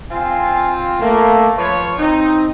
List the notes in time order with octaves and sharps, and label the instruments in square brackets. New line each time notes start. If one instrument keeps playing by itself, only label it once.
[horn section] C4 F4 [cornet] G#5
[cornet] A3 [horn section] A#3
[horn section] F3 C#5 [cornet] B4
[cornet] C4 [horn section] D#4